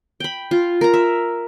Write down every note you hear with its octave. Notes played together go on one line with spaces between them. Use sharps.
G5 B5
F4
A#4 A#5
E5